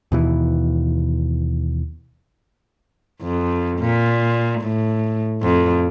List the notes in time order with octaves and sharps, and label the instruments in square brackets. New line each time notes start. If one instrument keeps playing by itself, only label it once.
[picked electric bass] D#2 B2 E3
[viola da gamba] F2
A#2
A2
F2